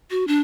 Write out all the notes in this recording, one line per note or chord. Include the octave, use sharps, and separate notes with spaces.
F#4
D4